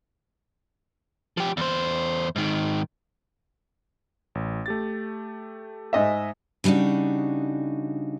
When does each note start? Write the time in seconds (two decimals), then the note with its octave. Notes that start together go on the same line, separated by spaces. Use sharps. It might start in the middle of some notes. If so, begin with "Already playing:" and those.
1.37 F3 G4
1.57 E2 C5
2.36 G#2 D#3
4.35 A1
4.66 A3 G4 A6
5.93 G#2 D#5 E5
6.64 C#3 G3 D4 D#4 F#4